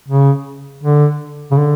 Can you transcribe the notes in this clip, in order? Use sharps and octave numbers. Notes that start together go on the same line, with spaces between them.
C#3
D3
C#3
D3